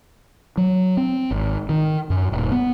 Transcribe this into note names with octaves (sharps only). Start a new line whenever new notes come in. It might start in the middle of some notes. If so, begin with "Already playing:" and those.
F#3
C4
G#1
D#3
F#2
D#1
B3